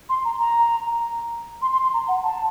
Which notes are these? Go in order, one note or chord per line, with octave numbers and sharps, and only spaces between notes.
C6
A#5
A#5
C6
C6
C6
A#5
F#5
A5